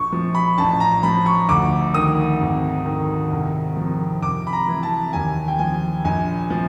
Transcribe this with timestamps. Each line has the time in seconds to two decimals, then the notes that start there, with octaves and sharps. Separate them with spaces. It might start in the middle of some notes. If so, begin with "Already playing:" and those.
Already playing: A#1 C#6
0.12 F3
0.35 B5
0.58 A1 A5
0.80 A#5
1.03 F3 B5
1.26 C#6
1.48 D2 D6
1.94 D#3 D#6
2.40 G#1
2.86 D#3
3.31 C2
3.77 F3
4.22 C2 D6
4.47 B5
4.53 A#5
4.68 E3
4.83 A5
5.13 D#2 G#5
5.48 G5
5.58 F3 G#5
6.04 A#1 G#5
6.50 F3